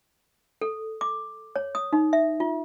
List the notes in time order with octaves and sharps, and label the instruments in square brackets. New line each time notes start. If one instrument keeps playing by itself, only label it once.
[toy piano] A4
D6
C#5
D#6
D#4
E5
F4